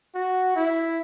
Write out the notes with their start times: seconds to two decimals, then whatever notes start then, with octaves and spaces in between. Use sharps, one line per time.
0.15 F#4
0.56 E4